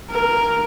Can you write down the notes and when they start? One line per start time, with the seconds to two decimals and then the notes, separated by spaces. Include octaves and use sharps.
0.10 A#4